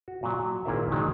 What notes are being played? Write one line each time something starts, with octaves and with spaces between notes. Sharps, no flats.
F#4
A#2 F#3
F#3
G#1 A#2 E4 A#4 C5 E5
D#3 F#3 G#3 D4 D#4